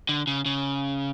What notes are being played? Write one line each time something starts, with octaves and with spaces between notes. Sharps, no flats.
D3
C#3
C#3